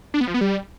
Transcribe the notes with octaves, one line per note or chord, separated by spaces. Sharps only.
D4
B3
F3
B3
G3